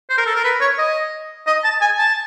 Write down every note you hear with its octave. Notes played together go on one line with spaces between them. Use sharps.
C5
A#4
A4
A#4
B4
C#5
D#5
D#5
A5
G#5
A5